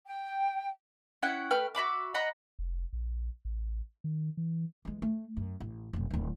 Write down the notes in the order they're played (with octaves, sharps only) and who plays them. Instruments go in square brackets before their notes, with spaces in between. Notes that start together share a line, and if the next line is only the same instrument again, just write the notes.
[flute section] G5
[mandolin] C#4 E4 F#5 G5
A3 B4 G5 F6
F#4 E5 B5 D6
D#5 F#5 A#5 B5
[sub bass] F1
A#1
A1
D#3
E3
[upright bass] E3 G#3
A3
F#2
A1
F1 B1
D1 D#3